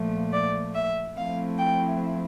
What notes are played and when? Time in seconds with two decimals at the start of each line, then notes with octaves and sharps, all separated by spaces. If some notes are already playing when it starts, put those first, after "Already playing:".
Already playing: A#2 F3 A3
0.33 D5
0.75 E5
1.16 F3 A3 C4 E4 F5
1.58 G5